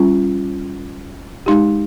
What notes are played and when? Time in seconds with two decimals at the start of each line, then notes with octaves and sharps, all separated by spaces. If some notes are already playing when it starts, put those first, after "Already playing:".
Already playing: G3 C#4 F4
1.46 G#3 D#4 G4